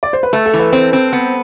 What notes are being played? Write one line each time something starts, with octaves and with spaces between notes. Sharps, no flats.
D5
C5
B4
A3 A4
A4
E3
B4
C4 C5
C4
B3